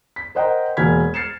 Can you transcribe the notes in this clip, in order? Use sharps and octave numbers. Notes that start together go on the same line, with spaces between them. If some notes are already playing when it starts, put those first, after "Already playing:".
B6
A#4 C5 D#5 F#5 G5 A#5
E1 A#3 G#4 F6 G#6 B6
F6 A6 C7 C#7 E7